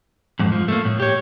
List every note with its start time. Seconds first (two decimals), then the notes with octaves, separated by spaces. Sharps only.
0.39 F2 G#2
0.52 F3
0.68 A3 A#3
0.85 A2
1.00 G4 C#5